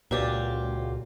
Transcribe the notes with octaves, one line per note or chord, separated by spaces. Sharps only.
C#2 A#2 F#3 F4 G4 B4 D5